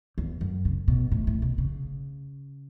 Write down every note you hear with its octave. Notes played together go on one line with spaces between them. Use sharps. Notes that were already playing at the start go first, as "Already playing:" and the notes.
E2
F#2
C#3
B2
A2
A2
B2
C#3